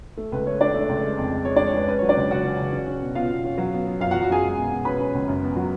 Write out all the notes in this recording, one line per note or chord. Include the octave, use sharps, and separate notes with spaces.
A3
C#2 B4
A3 C#5
A3 D4 D5
A3
C#2
G#3
F2
G#3
G#3 C#5
G#3 D4 D5
C#5
G#3 B4
C#4 B4
F#3 C#5
D4 D5
C#2
C#3 F#4 F#5
C#4
C#3
C#4
C#4
B2
B2 F4 F5
B2
C#4
F#3
B3
B3
F#2 F4 F5
F#4 F#5
F#3
F#4 F#5
F#2 G#4 G#5
G#3
B2
B2
C#4 B4 B5
C#4
C#2
F#2
B3
F#3